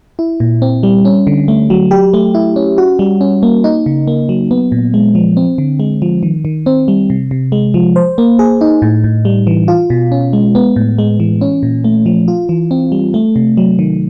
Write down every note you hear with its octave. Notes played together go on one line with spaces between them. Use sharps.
E4
A#2
C4
G3
C#4
D3
A3
F#3
G4
A3
E4
C#4
F#4
G3
C#4
A#3
D#4
C#3
A#3
F#3
B3
A#2
G#3
F3
C4
D3
G#3
F3
D#3
D#3
C4
G3
C3
C3
G#3
F3
C5
A#3
G#4
D#4
A2
A2
G3
E3
F4
B2
C#4
G#3
B3
A2
G#3
E3
C#4
A#2
A3
F3
F4
E3
C4
G3
A3
C3
F#3
D#3